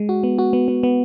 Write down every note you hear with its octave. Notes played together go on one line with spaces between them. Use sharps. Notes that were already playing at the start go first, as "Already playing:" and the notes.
Already playing: G#3
F#4
B3
F#4
B3
B3
B3